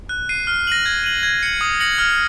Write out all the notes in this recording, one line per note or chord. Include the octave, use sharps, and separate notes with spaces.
F#6
C7 D#7
F6
A#6 D#7 F#7
G#6
D#7 F#7
G#6
C#7 F#7
D#6
A#6 C#7 F#7
F6